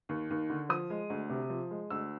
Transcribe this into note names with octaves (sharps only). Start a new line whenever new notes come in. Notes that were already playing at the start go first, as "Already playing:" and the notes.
D#2
D#2
D3
F3 D#6
G#3
D2
C3
F3
G#3
D2 E6